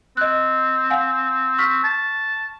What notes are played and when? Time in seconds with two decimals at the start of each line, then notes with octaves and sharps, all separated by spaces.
0.17 C4 D#5 F#6
0.90 F5 F#5 G#5
1.58 C#6 F6 B6
1.84 A5